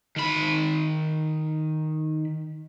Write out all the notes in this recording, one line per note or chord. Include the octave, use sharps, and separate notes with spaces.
D#3 B5